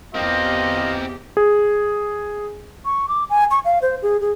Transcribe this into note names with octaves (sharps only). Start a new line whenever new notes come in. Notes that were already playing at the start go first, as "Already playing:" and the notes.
E2 C4 F4 G4 A#4 D#5
G#4
C#6
D6
G#5
C#6
F5
C5
G#4
G#4